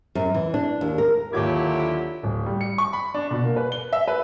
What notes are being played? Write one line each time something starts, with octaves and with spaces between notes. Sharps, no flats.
F#2
E3
D4
D#2
A#4
D#2 D3 F#3 E4 F4 G4 D6 G#6
D1
G3
C#7
C#6
B5
D4
B2
A#3
B4
G7
E5
B4